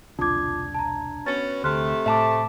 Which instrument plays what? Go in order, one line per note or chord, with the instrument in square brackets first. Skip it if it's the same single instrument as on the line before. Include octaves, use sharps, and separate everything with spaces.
[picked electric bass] E1 C2 [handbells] D4 G#6 [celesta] F4 D6
[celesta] A5 A#5
[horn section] B3 C#4 F#4 [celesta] A6
[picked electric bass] D2 [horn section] C3 A3 [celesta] C6 F6 F#6
[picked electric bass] A2 [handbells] E5 A5 D6